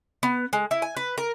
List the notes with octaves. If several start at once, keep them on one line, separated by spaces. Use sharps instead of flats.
B3
G#3
E4
G#5
B4
A#4